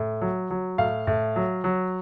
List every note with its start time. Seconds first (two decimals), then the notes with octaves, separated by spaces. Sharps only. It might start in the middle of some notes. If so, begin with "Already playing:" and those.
Already playing: A2
0.21 F#3
0.51 F#3
0.78 A2 F5
1.07 A2
1.36 F#3
1.64 F#3